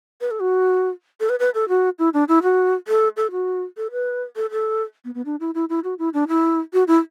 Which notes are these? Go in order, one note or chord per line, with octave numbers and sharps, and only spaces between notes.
B4
A4
F#4
A4
B4
B4
A4
F#4
E4
D4
E4
F#4
A4
A4
F#4
A4
B4
A4
A4
B3
B3
D4
E4
E4
E4
F#4
E4
D4
E4
F#4
E4